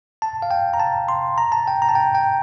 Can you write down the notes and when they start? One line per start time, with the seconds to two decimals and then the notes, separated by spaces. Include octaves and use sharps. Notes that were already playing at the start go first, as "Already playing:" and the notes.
0.22 A5
0.42 F5
0.51 G5
0.74 A#5
0.80 A5
1.09 C6
1.38 A#5
1.52 A5
1.67 G5
1.82 A#5
1.89 A5
1.95 G5
2.15 G5